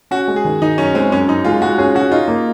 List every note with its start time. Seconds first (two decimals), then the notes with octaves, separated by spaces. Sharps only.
0.11 C#4 F#4
0.28 G#3
0.36 G#4
0.45 D#3
0.62 D#3 D#4
0.78 F#2 C#4
0.94 G#3 C4
1.12 F#2 C#4
1.28 F#2 D#4
1.44 G#3 F4
1.62 G#3 F#4
1.78 C#4 G#4
1.95 C#4 F#4
2.11 D#4 F4
2.28 A#3